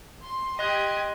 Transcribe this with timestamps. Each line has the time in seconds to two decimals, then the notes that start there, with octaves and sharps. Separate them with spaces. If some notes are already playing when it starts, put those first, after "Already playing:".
0.24 C6
0.59 G4 D#5 C6 D#6 F#6 G#6